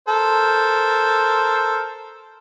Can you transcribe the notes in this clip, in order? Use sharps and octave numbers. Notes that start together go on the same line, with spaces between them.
A4 A#4 C5